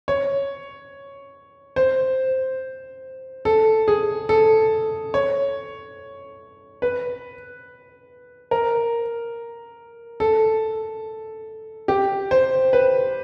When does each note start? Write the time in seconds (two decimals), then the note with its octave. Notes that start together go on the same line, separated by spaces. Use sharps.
0.08 C#5
1.76 C5
3.45 A4
3.88 G#4
4.29 A4
5.14 C#5
6.82 B4
8.51 A#4
10.20 A4
11.88 G4
12.31 C5
12.73 B4